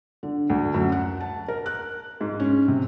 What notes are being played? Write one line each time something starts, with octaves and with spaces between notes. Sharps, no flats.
D3
D2
F#2
F#5
A5
A#4
F#6
G#2
C#4
C3